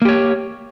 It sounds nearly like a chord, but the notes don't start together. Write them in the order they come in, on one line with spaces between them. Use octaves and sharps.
A#3 G4 C#5